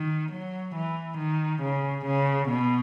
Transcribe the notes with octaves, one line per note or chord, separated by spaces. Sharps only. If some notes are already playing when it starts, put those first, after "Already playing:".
Already playing: D#3
F#3
E3
D#3
C#3
C#3
B2